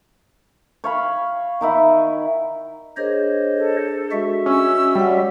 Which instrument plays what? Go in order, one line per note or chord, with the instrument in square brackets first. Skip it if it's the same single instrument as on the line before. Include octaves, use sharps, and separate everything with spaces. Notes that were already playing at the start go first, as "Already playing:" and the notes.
[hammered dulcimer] C#5 F5 B5
D#3 D#4 E4 F#5
[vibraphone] D4 G#4 A#4 [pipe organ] C5 C#5 D#5
[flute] A4
[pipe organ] G#3 F#4 E5
[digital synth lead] C#4 [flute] E6
[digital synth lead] G3 [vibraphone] C#5 F#5